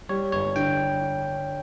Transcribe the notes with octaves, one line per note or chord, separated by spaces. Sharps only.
G3 C#5
G1 C#5
D3 G5